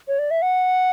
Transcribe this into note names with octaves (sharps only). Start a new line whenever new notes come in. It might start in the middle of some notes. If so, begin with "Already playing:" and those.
C#5
D5
E5
F#5